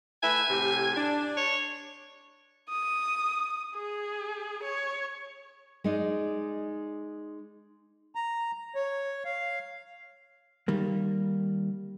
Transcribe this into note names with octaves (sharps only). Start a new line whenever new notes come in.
A3 B4 E5 G#5
A2 C3 G4
D4
C#5
D#6
G#4
C#5
G#3 D#4 D5
A#5
C#5
F5
D#3 G3 A#3